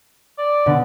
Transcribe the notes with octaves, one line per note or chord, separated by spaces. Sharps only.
D5
B2 D3